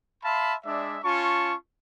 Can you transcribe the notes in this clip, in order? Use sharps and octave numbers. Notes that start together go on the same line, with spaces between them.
E5 F5 A5 B5 C6
G#3 D4 D5 E5
C#4 F4 A5 C#6